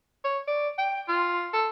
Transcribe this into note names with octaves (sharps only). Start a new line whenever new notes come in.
C#5
D5
G5
F4
A4